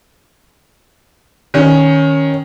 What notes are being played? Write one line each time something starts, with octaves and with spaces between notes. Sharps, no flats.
D#3 C#4